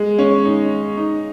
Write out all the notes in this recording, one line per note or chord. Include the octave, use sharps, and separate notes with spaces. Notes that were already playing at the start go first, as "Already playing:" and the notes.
Already playing: G#3
C#4
D#4
D#4